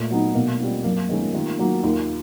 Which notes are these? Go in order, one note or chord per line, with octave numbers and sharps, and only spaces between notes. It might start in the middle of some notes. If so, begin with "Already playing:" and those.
Already playing: A#2 A3
F#3 B3 D#4
B2 A#3
G3 C4 F4
F#2 A#3
A#3
D#3 G#3 A3 B3 C#4
D#4 F4
D#3 F4 G4
F#3 A#3
F#4
D#2 D#4 F4